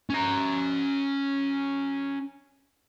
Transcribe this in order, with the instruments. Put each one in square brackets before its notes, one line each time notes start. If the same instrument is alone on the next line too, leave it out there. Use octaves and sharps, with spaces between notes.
[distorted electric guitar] C#4 A#5